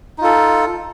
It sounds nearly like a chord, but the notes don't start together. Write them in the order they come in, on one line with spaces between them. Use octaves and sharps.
D#4 F4 A4